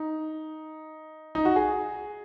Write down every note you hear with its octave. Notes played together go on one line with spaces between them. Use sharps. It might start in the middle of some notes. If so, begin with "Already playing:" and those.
Already playing: D#4
D#4
F#4
G#4